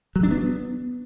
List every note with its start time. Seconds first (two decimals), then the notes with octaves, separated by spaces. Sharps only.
0.16 F#3
0.23 D4
0.31 B3